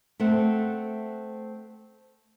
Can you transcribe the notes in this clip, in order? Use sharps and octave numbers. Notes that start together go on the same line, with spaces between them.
A3 C4 A4 F#5